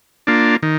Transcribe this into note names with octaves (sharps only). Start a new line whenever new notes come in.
A#3 D4 F4
D#3